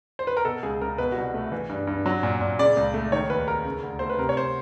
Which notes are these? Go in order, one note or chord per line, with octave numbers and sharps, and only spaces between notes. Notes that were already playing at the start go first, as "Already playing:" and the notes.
C5
B4
A#4
B2 A4
C#2 G#4
C#2 A#4
B2 B4
C2 F#4
A3
E3
G2
G2
F#3
A#2
A#2
C#3 D5
C#2
A3
D#3 C#5
D#2 B4
D#2 A#4
C#3
D2
A3 C5
B4
C3 A#4
C#5
C5